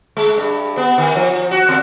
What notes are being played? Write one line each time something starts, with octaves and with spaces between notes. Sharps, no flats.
G#3
G2
B3
D#3
F3
F#4
E2